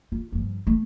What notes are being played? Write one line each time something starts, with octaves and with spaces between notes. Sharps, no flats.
F4
G2 F3
A3